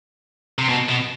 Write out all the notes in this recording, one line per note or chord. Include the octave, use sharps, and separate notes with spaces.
C3
B2
B2